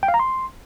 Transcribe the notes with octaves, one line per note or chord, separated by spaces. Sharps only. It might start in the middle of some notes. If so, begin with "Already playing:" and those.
G5
F5
A#5
C6